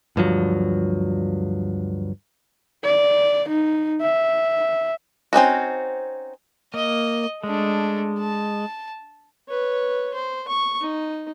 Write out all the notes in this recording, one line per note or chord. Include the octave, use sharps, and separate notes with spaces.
D2 G2 F3 F#3
D5
D#4
E5
C4 C#4 D#4 F#4
A#3 D#5
G#3 A3 D4
A5
B4 C#5
C5
C#6
D#4